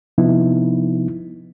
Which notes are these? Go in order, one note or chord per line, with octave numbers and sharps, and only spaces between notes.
C3 F3 B3 D#4 E4